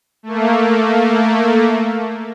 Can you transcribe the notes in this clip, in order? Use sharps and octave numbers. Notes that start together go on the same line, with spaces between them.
A3 A#3